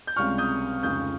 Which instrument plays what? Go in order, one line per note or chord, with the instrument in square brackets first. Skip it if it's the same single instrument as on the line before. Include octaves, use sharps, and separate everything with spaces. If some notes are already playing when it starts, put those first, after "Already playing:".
[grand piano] G6
[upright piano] C#2 C3 G3 C#4 [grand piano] C#6 F6
[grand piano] D#6 G6
[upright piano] F1 F2 C#3 G#3 [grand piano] D#6 G6